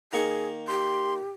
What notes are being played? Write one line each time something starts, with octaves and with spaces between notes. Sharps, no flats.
D#3 A#3 G#4 C#6
G4 C6